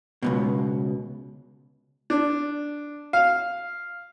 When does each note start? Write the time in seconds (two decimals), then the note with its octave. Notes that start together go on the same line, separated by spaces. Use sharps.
0.22 C#2 G2 B2
2.10 D4
3.13 F5